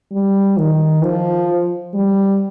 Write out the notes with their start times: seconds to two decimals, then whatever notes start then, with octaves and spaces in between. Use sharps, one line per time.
0.12 G3
0.58 D#3
1.03 F3
1.94 G3